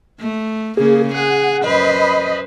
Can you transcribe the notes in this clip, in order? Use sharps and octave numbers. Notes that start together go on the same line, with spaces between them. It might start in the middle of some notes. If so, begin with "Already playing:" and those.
A3
C#3 A#3 G#4
G#4 F#5
F#2 B4 C5 D#5 B5